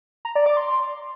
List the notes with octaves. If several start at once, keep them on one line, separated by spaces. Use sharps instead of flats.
A#5
D5
D6
C6